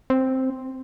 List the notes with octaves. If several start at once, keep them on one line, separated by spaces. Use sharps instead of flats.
C4